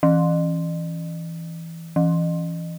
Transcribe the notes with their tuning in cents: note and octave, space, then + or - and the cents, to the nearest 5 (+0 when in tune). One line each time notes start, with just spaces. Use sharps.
E3 +5
E3 +20